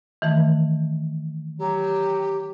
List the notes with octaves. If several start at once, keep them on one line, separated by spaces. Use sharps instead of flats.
D#3 E3 A3
F#3 G4